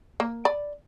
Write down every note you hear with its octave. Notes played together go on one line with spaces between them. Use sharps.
A#3
D5 B5